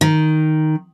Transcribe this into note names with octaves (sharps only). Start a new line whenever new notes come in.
D#3